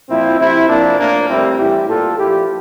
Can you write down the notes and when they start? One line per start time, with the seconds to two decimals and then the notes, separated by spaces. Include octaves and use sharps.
0.09 A#2 F3 C4 E4
0.40 C3 F3 C4 E4
0.69 A#2 F3 A#3 D4
0.99 A2 F3 A#3 D4
1.29 A2 G3 C4 E4
1.59 A2 E3 G3 E4 G4
1.89 A#2 G3 F4 A4
2.18 A#2 F3 E4 G4